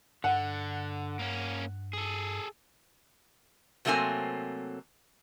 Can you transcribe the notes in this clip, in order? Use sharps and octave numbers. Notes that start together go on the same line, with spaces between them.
G2 D3 F#5
A#3 C#4
G#4 A4
C3 F#3 A3 A#3 C4 G#5